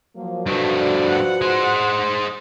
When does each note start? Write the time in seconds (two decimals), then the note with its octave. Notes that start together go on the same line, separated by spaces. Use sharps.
0.16 F3 F#3 A#3
0.47 G2 F3 A3 F#4 B4
0.82 D5
1.10 F#5
1.42 G#3 C5